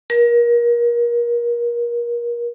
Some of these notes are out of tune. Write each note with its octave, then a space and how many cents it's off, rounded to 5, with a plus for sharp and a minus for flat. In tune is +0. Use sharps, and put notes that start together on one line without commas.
A#4 +30